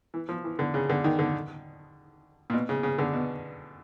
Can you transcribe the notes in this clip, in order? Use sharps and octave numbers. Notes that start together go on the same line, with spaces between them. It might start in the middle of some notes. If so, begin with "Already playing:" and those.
E3
F3
E3
D3
C#3
D3
D#3
D3
A#2
B2
C#3
C#3
D3
B2